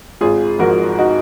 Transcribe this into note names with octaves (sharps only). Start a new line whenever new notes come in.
G#1 F4 G#4
G#2 F3 F#4 A#4
D#4 F#4